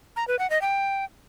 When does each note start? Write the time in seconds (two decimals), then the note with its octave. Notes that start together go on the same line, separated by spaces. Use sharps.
0.16 A#5
0.28 B4
0.39 F#5
0.50 D#5
0.62 G5